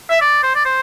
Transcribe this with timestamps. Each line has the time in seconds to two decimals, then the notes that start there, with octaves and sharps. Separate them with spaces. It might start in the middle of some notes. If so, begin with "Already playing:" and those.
0.10 E5
0.21 D5
0.43 C5
0.55 D5
0.65 C5